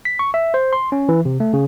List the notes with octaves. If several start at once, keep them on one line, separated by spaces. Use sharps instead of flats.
B6
C#6
E5
C5
C6
C#4
E3
C3
A3
C#3